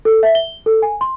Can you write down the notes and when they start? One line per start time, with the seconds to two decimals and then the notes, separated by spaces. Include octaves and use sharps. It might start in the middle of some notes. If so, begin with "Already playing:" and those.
0.05 A4
0.23 E5
0.35 G7
0.66 A4
0.82 G#5
1.01 C6